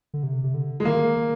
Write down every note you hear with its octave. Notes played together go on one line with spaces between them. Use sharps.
D3
C3
C3
D3
G#3
D#3 A#3
D#3